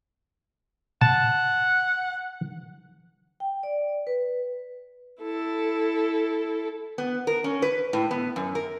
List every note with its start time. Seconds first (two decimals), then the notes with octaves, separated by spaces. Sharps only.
1.01 F#5 A5
3.40 G5
3.63 D5
4.07 B4
5.23 E4 A4
6.98 B3
7.27 A#4
7.44 C#4
7.62 B4
7.93 A2
8.11 B3
8.36 F#2
8.55 A#4